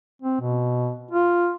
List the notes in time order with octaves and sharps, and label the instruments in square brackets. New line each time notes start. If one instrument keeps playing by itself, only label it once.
[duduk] C4
B2
F4